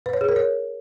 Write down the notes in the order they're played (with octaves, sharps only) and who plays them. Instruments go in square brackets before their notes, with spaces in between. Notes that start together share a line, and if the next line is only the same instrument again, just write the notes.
[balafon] B4
C#5
G#4
A#4
C#5